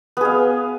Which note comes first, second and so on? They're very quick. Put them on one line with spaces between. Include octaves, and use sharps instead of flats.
B3 G#4 F5